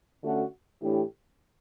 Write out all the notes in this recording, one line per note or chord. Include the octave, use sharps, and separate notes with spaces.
D3 A3 C#4 F#4
A2 E3 A3 D4 G4